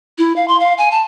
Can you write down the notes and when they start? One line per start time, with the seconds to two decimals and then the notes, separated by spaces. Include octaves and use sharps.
0.18 E4
0.36 F5
0.48 C6
0.60 F5
0.78 G#5
0.91 A5